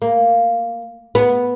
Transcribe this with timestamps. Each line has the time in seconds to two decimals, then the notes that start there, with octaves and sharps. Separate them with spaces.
0.02 A#3
1.15 B3